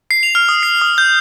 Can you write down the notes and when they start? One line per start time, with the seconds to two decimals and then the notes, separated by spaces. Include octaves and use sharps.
0.11 C7
0.23 F7
0.35 F6
0.49 D#6
0.63 C7
0.81 D#6
0.98 G6